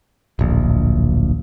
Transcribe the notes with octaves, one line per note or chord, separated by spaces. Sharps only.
D1 A#1